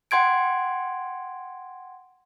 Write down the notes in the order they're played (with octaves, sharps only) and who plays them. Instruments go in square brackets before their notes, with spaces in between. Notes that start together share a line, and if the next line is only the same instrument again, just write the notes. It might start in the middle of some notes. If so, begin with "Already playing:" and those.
[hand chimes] F#5 G5 C6 G#6 D7